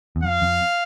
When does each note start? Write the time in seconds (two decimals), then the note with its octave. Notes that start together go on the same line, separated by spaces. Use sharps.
0.16 E2
0.23 F2 F5
0.42 F2